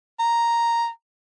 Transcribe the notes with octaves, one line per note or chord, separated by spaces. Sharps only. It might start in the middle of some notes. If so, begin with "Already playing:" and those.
A#5